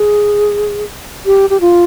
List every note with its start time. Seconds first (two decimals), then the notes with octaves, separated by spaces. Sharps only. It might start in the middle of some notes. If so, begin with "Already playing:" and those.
Already playing: G#4
1.26 G4
1.50 G4
1.61 F4